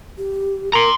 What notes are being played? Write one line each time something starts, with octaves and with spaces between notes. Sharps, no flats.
G4
A#4 A#5 C6